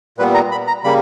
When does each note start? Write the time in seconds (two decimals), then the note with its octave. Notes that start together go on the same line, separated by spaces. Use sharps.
0.18 A#2 G3 B3 B4
0.34 A#5
0.51 B5
0.68 A#5
0.84 C#3 G3 A#3 B5